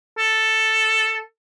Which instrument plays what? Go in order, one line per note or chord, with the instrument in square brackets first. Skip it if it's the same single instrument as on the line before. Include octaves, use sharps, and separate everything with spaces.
[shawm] A4